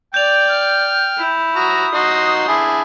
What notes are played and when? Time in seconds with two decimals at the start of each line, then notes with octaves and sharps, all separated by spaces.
0.14 D5 G5 G6 F7
0.49 F6
1.18 E4
1.56 F#4 A#5 D#6
1.94 D#4 F#4 D#5 C6
2.48 D4 E4 G#4